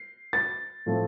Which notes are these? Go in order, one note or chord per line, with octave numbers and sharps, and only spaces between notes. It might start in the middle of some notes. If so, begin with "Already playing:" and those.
Already playing: C7
A6
A2 F3 A3 C4